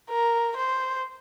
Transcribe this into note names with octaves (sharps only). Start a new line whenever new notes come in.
A#4
C5